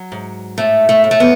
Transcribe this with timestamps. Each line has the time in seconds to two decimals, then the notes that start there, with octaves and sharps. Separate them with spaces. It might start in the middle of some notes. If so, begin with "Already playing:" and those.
Already playing: F#3
0.12 G#2
0.58 A2 A3
0.89 A3
1.04 A2
1.11 A3
1.20 B3